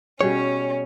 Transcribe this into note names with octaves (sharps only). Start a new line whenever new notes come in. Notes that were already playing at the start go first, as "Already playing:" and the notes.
B2 G3 C#4 G#4 C#5